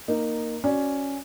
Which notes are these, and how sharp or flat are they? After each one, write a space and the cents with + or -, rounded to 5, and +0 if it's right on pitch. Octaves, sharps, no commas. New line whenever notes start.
A#3 +0 D#4 -10
C#4 +0 F#4 +0 D5 +0